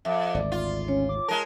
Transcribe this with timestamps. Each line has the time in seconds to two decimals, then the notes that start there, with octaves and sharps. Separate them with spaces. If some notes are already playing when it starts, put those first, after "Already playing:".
0.05 F2 E5
0.34 G#1 D2 D5
0.52 F4
0.88 C#4 C#5
1.09 D6
1.28 G#3 A#4 A5